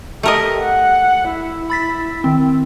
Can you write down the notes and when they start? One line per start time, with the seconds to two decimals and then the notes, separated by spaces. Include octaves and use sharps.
0.23 A3 G4 A#4 D#5
0.60 F#5
1.29 E4
1.70 B5 A6 B6
2.24 D#3 C4